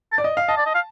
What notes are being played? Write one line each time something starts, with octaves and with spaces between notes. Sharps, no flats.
A5
D5
D#5
F5
D#5 A5
D5
D#5
F5